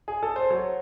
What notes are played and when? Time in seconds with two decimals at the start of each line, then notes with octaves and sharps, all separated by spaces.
0.08 G#4
0.23 A4
0.36 C5
0.50 F#3 C#5